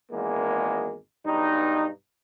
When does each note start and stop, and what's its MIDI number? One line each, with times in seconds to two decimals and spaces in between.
0.12 0.97 32
0.12 0.97 40
0.12 0.97 56
0.12 0.97 58
1.25 1.88 35
1.25 1.88 43
1.25 1.88 63